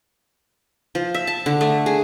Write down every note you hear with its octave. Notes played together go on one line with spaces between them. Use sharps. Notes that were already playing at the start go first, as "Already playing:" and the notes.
F3
E5
A5
D3
A3
G#4